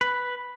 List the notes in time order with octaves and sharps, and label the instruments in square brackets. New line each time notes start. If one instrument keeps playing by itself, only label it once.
[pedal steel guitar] B4